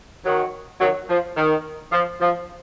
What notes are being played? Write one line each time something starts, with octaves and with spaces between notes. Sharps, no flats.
D#3 F#3
D#3 F#3
F3
D#3
F3
F3